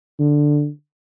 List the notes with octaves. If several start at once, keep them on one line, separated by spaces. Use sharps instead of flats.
D3